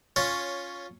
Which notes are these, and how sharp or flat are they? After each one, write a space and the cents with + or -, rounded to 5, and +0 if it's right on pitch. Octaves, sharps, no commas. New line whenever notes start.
C#4 +0 F4 +10 C#5 +10